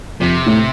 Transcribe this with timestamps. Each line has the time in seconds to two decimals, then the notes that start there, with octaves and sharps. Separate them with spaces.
0.20 F2 C3
0.46 A2